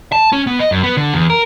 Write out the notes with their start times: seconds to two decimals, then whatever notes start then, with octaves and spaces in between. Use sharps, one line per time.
0.12 A5
0.32 C#4
0.47 B3
0.60 D#5
0.72 F#2
0.83 B3
0.97 D3
1.14 E2
1.30 A#4